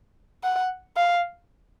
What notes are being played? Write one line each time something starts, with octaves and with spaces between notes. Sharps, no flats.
F#5
F5